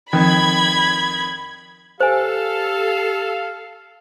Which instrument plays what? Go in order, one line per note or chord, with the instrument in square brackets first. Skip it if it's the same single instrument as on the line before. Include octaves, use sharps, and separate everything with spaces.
[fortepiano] F2 D#3 [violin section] B5 G#6
[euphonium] G4 [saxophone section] A4 [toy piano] C5 G#5 [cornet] F5